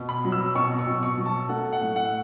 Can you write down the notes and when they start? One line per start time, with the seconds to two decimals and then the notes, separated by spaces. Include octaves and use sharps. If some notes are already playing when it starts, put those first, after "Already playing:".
Already playing: B2
0.09 B5
0.24 F#3
0.32 E6
0.55 B2 C#6
0.79 C#6
0.86 B2
1.03 C#6
1.17 F#3
1.25 A5
1.49 A3 F#5
1.73 F#5
1.80 A2
1.96 F#5